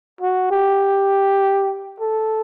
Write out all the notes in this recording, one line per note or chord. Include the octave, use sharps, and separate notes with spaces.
F#4
G4
A4